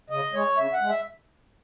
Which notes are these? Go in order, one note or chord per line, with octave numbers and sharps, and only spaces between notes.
C#3 D#5
G#3 C#5
C#3 E5
F#5
G#3
E5